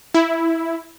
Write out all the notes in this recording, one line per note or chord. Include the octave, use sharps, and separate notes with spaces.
E4